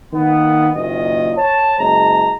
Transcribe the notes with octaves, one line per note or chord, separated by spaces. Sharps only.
D#3 A#3 B3
F#1 A#2 D#3 D#5
C#5 A5
F#1 G#3 A5 A#5